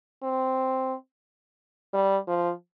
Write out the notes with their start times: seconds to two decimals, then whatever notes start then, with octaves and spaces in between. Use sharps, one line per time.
0.23 C4
1.93 G3
2.28 F3